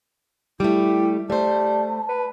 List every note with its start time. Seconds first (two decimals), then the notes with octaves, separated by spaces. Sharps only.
0.60 G3 A3 E4 G4
1.30 G3 A3 C5 A5
2.09 B4